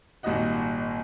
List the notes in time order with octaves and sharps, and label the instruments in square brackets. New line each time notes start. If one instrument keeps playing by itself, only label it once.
[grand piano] G#1 A#2 G3 F#4 D#5 F#5